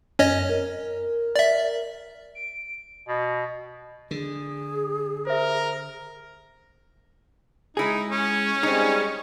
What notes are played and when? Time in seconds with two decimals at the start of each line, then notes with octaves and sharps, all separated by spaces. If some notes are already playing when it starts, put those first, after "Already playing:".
0.19 F#2 C#4 C#5 D#5
0.49 A#4
1.36 D5 E5
2.35 D7
3.08 B2
4.11 D3 G#4
5.27 A#4 C5 E5
7.77 G#3 D#4 E4 G#4
8.11 C#4
8.63 G3 G#3 C4 D#4 G#4